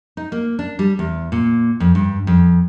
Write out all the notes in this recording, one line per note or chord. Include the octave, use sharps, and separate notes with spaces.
D#4
A#3
D4
G3
E2
A#2
F2
G2
F2